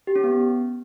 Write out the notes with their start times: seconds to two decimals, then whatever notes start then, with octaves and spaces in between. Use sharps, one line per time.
0.07 G4
0.16 C#4
0.24 B3